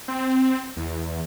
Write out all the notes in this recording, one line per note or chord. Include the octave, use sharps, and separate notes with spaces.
C4
E2